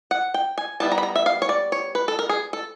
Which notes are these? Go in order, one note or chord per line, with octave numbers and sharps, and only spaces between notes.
F#5
G5
G#5
G3 B3 E4 A5
A#5
B5
A#5
E5
F5
C#5
D5
C#5
B4
A4
A#4
G#4
A4